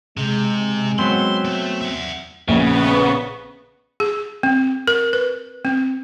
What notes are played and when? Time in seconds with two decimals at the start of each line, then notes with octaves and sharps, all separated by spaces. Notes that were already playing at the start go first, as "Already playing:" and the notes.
0.17 C3 G#3
0.99 F#3 B3 C4 C6
1.45 A3
1.81 E5 F#5
2.48 A#1 C#3 B3
4.00 G#4
4.43 C4
4.88 A#4
5.13 B4
5.65 C4